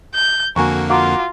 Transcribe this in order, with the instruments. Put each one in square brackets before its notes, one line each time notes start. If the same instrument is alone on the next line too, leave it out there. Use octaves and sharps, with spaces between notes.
[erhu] G6
[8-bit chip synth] F2 D3 A#3 [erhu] F#4 [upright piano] G#5 A#5 C#6
[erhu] F4 [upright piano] F#4 A#5 D6